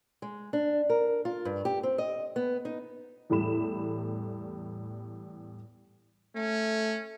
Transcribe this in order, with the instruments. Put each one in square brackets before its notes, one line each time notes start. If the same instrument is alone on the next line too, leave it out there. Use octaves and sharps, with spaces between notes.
[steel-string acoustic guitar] G#3
D4
A#4
F4
G2
G4
C4
D#5
B3
D#4
[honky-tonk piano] E2 A2 G3 B5 E7
[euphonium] A3 [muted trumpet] C#4